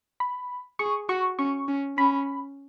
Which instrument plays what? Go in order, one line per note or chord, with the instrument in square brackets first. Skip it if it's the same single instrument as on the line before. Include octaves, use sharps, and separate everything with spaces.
[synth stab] B5
[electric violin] G#4 [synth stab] C#6
[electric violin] F#4 [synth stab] C#6
[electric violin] C#4 [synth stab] C#6
[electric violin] C#4
[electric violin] C#4 [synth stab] B5